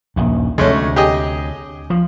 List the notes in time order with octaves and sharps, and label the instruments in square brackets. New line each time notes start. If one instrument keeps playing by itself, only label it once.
[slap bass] D#1 A#1 D#2
[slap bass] D2 C3 [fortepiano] G#3 A3 C#4
[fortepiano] G4 G#4 D#5
[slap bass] F3